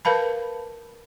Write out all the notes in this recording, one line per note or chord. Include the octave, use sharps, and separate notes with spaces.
A#4 B4 F5 A5 B5